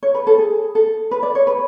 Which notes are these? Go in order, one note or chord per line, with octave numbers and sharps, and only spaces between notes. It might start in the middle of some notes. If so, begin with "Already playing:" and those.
C#5
B4
A4
G#4
A4
B4
D5
C#5
B4